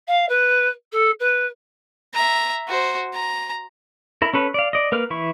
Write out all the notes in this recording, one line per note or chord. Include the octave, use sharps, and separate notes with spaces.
F5
B4
A4
B4
E5 A#5
F#4 C5
A#5
E4 A#4
C#4 A4 B4
D5 F5
D5 D#5
A#3 A#4 B4 F6
E3 E4 C#6